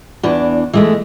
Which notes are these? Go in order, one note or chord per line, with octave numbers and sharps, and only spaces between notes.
E2 E3 D4
E3 G#3 A3